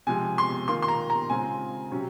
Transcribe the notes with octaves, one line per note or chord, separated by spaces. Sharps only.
C3 F3 G#3 G#5
C6
D#3 A#3 F4 C6
C6
A#5
A#5
C#3 G#3 C4 F4 G#5
C3 F#3 C#4